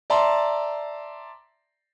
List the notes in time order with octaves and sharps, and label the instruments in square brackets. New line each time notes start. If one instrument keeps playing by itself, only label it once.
[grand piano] D5 E5 A5 A#5 C6